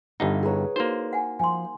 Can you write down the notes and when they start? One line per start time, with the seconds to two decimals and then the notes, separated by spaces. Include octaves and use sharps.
0.20 G1 G2 D#4 E4 F#5
0.43 E4 G#4 B4 C#5 A#5
0.76 A#3 D#4 F#4 C5
1.13 F#5 G#5
1.39 F3 G#5 C6